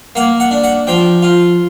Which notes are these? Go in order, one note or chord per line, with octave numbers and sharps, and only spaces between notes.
A#3 F#5
F#5
D4
F#5
F3 G5
F4